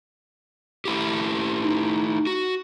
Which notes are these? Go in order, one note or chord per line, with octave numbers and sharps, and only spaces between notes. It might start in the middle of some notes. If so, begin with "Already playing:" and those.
A3 E4 G4
D#4
F#4